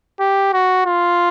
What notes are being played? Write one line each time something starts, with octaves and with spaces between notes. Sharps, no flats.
G4
F#4
F4